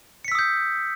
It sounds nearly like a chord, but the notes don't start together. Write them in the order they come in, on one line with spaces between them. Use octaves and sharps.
C#7 B6 E6 D#6 G6